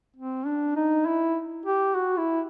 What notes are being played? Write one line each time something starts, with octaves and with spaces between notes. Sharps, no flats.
C4
D4
D#4
E4
G4
F#4
E4